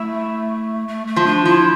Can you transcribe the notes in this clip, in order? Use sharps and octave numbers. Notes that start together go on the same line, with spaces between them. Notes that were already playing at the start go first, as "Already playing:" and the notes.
Already playing: A3 E4
A3
A3
F3
D4
F3 E4